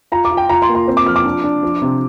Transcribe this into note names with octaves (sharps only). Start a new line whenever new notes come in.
F4 A#5
D6
F4
G5
F4 A#5
C6
A#3
C6
C4
D6
F3 F6
D6
D4
D4
F3
C3